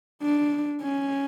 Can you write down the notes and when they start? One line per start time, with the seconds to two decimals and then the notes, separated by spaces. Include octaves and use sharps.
0.23 D4
0.83 C#4